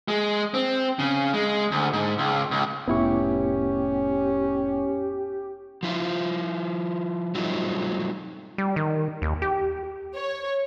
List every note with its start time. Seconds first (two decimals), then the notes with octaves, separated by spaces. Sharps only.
0.08 G#3
0.54 C4
0.99 C#3
1.34 G#3
1.71 D2
1.93 G#2
2.18 C#2
2.51 C#2
2.88 F1 A2 B3 C#4 E4 G4 C#6
5.83 F3 E4 F4
7.35 F#3 G3 A3 C4 D#4 F4
8.58 G3
8.76 D#3
9.22 D#2
9.42 G4
10.15 C#5